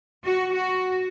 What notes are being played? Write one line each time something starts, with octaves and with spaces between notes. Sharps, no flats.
F#4
F#4